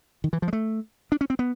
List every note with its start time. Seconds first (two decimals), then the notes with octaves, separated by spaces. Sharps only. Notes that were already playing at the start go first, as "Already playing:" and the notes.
0.24 D#3
0.33 E3
0.42 F3
0.48 G#3
0.53 A3
1.12 D4
1.21 C#4
1.30 C4
1.39 B3